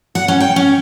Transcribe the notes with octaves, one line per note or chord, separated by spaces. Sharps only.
F#5
C#4
G5
C#4